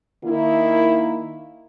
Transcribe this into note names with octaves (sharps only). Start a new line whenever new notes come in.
D#3 A#3 E4